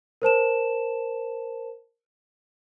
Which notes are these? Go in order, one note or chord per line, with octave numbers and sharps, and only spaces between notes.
A#4 C5 A5 E7